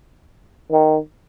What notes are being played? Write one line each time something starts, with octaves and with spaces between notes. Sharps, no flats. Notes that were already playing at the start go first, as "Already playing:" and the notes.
D#3